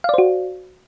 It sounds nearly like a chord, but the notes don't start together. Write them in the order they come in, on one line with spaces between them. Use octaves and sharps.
F5 D5 C5 F#4